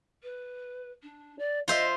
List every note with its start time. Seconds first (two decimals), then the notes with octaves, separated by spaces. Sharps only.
0.22 B4
1.02 D4
1.38 D5
1.68 F4 C5 D#5 E5